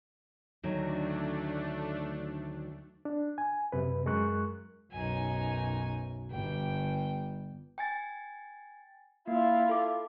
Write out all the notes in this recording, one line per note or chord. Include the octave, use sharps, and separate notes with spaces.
D2 D#3 F#3 A3 D4
D4
G#5
F#2 C3 B4
F#2 G#3 A#4 C#6 F#6
B1 F#2 D#4 G#5
G1 G3 G5
G5 G#5 A6
A#3 E4 F4
A4 D6